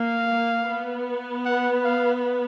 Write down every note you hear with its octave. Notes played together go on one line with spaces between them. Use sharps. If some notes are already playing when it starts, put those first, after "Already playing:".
Already playing: A#3 F5
A#3
B3
F#5
F5